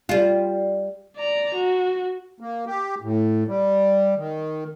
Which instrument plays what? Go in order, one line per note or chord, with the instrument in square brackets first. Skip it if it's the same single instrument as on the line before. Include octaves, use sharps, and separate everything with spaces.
[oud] G3 F4
[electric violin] D5 A#5
F#4
[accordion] A#3
G4
A2
G3
D#3